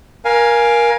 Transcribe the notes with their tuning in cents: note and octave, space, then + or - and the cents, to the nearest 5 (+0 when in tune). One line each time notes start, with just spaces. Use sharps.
A#4 +20 F5 +0 G#5 +0